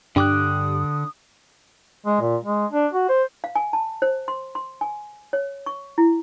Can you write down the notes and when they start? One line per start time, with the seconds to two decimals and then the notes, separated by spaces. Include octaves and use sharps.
0.16 G2 D3 D4 G4 D6 D#6 F#6
2.06 G#3
2.21 A#2
2.42 G#3
2.71 D4
2.93 F#4
3.09 C5
3.44 F5
3.55 G#5
3.73 A5
4.02 C5
4.28 C6
4.55 C6
4.81 G#5
5.33 C#5
5.66 C#6
5.98 E4